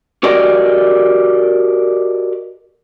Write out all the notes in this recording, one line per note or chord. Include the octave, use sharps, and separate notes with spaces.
F#4 G4 A4 A#4 D5 D#5